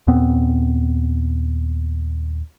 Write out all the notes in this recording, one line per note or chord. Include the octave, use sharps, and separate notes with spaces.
D#2 A#2 B3 C4